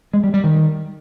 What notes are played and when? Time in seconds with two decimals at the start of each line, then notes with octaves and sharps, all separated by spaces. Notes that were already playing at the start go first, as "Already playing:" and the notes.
0.14 G#3
0.24 G3
0.34 G3
0.44 D#3